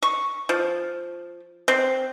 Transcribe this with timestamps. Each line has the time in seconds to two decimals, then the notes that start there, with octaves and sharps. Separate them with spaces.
0.02 C#6
0.49 F3
1.68 C4